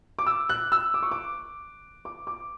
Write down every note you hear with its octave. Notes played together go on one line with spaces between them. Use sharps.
D6
E6
F#6
E6
D6
C#6
D6
D6
D6